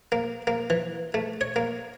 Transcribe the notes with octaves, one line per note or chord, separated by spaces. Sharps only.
A#3
A#3
E3
A3
C#5
A#3